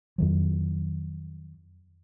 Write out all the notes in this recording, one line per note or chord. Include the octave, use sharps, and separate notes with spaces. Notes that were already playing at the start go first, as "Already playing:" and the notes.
F2 D#3 F#3